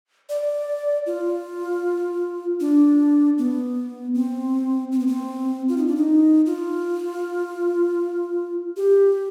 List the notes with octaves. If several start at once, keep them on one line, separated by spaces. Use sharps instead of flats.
D5
F4
D4
B3
C4
C4
B3
C4
F4
D#4
D4
D#4
F4
G4